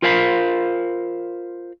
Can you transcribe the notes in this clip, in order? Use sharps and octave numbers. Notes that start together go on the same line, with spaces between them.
F4 A#4 C5 F5 G5 B5